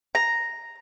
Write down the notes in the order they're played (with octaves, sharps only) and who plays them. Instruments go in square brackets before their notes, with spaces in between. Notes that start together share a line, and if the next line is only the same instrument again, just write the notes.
[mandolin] A#5